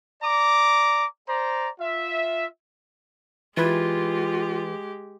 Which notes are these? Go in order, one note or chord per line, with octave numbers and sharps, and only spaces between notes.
D5 A#5 D6
C5 D5 A#5
F4 E5
E3 G#3 F4 G4 B4 G#6